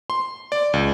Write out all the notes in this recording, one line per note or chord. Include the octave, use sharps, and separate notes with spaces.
C6
D5
C#2